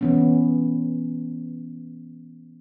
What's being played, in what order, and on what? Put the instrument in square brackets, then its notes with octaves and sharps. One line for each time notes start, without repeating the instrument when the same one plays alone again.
[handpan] E3 B3 C#4